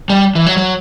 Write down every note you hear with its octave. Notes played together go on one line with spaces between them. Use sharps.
G3
E3
F#3
F#3